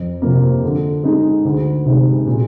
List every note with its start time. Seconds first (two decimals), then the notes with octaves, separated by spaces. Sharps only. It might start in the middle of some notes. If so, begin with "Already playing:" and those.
Already playing: F2
0.22 C3 F3 A#3
0.63 D3
1.04 G#3 D#4
1.44 D2
1.86 C3 D#3 G#3
2.27 A#2